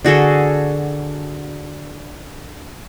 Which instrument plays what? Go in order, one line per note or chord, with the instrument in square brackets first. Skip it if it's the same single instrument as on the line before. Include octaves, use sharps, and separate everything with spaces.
[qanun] D3 F#4 G#4 A4